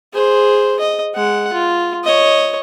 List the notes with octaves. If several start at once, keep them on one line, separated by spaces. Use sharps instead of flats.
G#4 C5
D#5
G#3 F#5
F4
C#5 D#5